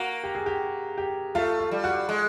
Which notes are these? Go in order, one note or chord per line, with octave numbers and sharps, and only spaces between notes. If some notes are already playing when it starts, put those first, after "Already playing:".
Already playing: A#3 F#4
G4
G#4
G4
G4
A3 F4
F4
G3
F#4
G#3